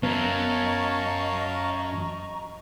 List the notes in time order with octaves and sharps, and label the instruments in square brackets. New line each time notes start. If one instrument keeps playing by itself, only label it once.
[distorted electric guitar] F#2 [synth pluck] B3 [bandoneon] C#5 F5 A5 [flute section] D#5 A#5 C#6